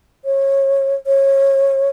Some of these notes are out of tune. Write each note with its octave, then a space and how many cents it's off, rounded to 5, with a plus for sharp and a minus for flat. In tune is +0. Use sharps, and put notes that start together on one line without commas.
C#5 -25
C#5 -25